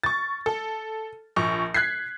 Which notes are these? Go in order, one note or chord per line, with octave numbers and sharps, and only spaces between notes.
C#6 A6
A4
A#1 C#6
F#6 G#6 B6 C7